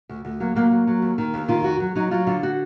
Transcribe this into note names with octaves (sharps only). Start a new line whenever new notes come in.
D2
D2
F#3 A#3
F#3 A#3
F#3
F#3
D#2
D#3
D#2
D#3 F4
F2 F#4
F#3
F#3 D#4
F#3 F4
D3 F4
F#4